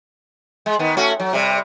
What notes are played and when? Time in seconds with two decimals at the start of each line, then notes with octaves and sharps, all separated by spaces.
0.66 G#3
0.79 D#3 B3
0.97 A3 C#4 F#4
1.20 F#3
1.33 C3 G3